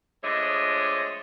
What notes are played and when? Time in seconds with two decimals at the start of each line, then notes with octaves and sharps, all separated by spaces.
0.24 F3 G#3 A3 D4 C#5 D#5